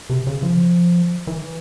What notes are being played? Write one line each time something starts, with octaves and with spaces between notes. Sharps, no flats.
C3
C#3
F3
E3